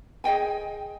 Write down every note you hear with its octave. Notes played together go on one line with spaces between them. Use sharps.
G#4 D#5 G5 G#5